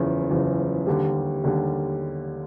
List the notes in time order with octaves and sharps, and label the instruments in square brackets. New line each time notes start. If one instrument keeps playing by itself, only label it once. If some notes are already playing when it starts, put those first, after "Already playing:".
Already playing: [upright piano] F#1 E2 C#3 F3
F#1 E2 C#3 F3
D#2 D3 G3
D#2 D3 G3